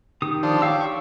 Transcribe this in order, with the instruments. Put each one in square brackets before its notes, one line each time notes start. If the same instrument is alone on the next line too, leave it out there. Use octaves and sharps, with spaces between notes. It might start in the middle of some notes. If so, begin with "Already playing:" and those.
[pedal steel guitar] D#3 G4 D#6
[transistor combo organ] F3 D4 C5
[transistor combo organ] G4 [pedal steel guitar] C#5 F5 E6
[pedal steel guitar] C#6